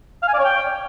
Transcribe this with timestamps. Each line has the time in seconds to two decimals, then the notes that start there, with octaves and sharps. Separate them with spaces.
0.23 F5
0.28 G#5
0.34 D5
0.39 C#5
0.45 G5